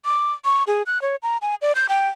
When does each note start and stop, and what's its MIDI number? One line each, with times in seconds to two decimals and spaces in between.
0.05 0.32 86
0.45 0.63 85
0.67 0.83 68
0.86 1.01 90
1.02 1.16 73
1.23 1.37 82
1.42 1.55 80
1.62 1.72 74
1.75 1.87 91
1.89 2.08 79